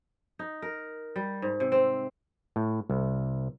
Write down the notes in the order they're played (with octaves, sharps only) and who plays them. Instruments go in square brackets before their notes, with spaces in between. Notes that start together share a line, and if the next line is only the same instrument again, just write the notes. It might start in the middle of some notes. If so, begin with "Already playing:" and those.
[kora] D#4
A#4
G3
G#2
C3
C4
[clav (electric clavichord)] A2
C2